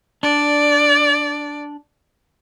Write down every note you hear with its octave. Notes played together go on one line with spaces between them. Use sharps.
D4 D5